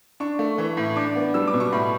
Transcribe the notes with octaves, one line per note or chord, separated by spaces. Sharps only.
D4 C#6
A3
E3
A2
D4 D6
B3
G3 E6
D6
B2
C#6
A2 B5